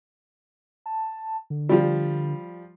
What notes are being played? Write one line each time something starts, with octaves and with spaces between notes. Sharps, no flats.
A5
D3
F3 G3